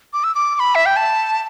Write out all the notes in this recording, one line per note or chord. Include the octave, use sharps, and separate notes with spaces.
D6
E6
D6
D6
B5
E5
G5
A5